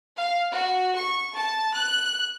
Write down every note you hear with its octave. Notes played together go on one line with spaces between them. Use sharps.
F5
F#4
C#6
A5
F#6